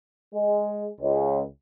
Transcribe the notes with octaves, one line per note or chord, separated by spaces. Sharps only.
G#3
C#2